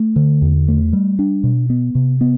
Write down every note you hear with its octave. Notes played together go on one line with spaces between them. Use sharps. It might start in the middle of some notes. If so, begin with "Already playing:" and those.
Already playing: A3
D3
E2
A3
G3
D4
B2
B3
C3
B3